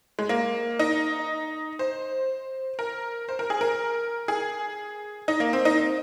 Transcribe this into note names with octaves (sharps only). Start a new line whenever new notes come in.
G#3
A#3
D#4
C5
A#4
C5
A#4
G#4
A#4
G#4
D#4
A#3
C4
D#4